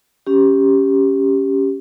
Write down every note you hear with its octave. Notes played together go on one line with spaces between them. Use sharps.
C#4 G4